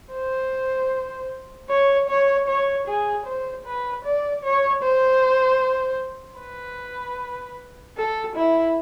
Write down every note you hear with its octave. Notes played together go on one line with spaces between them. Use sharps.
C5
C#5
C#5
C#5
G#4
C5
B4
D5
C#5
C5
B4
A4
E4